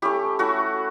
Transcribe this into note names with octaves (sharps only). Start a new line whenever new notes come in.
A3 C#4 E4 G4
A3 C#4 E4 F#4